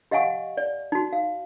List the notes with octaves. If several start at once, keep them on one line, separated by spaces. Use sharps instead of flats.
G4 D#5 F5 F#5 G#5 C#6
D5
D#4 F#4
F5